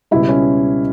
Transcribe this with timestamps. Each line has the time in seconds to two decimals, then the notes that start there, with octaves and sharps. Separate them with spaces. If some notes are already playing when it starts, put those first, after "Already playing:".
0.11 C#2 B2 G3 E4
0.29 C#4